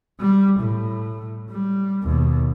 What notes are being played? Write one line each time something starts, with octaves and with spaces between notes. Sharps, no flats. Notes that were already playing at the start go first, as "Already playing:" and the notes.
G3
A2
G3
D#2 B2